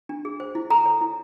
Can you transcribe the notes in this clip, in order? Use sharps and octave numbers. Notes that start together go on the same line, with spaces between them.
D4
G#4
C5
E4
A4 A#5
C#5
E4